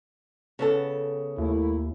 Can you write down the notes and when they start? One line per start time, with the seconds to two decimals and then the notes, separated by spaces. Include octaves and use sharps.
0.59 C#3 B3 A4
1.38 D#2 A3 A#3 E4